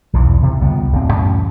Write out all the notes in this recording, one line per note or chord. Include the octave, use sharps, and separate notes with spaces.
B1 E2 E3 F3
C3
C#2 D#3 G3 B3
D1 B3 C4
F#2 A2 E3 C#4